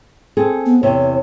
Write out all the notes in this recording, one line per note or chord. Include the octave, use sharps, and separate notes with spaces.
C4 G#4 A4
B3
E2 C3 C#5